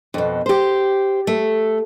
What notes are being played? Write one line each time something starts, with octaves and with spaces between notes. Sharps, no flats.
F2 B2
G4 C5
A3